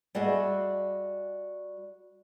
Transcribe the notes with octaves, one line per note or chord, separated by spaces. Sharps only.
G3 F#4 G#4 D#5 E5